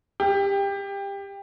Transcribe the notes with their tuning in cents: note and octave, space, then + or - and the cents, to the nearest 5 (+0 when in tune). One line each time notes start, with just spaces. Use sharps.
G4 +20